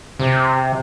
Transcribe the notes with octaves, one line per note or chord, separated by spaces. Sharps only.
C3